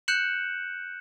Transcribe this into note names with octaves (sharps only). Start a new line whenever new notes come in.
F#6 G6 C#7 E7 F#7